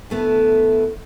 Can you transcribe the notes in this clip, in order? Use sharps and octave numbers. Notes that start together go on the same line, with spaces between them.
D2 A3 B3 E4